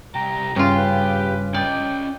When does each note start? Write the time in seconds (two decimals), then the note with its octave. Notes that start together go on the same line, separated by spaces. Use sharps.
0.15 C2 G4 A#5
0.56 G2 C#3 F4 G4
0.78 B4
1.54 C#4 D5 D#5 G5